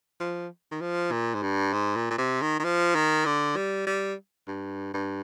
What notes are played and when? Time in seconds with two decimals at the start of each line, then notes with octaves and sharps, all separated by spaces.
0.20 F3
0.71 D#3
0.81 F3
1.11 A#2
1.34 G#2
1.42 G2
1.73 G#2
1.96 A#2
2.11 A#2
2.18 C3
2.41 D#3
2.59 D#3
2.64 F3
2.95 D#3
3.25 D3
3.56 G3
3.87 G3
4.48 G2
4.94 G2